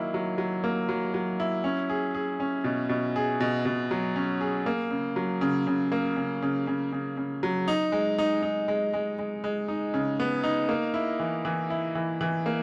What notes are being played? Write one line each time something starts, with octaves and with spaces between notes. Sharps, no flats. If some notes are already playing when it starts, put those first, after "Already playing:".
Already playing: D#3 F#3 A#3 E4
F#3
F#3
A#3
F#3
F#3
E4
C#4
G#4
G#4
C#4
B2
B2
G#4
B2
B2
F#3
C#4
G#4
A#3
C#3
F#3
C#3
C#3
A#3
C#3
C#3
C#3
C#3
C#3
F#3
D#4
G#3
D#4
D#4
G#3
G#3
G#3
G#3
D#4
C#3
B3
D#4
A#3
E4
E3
E3
E4
E3
E3
A#3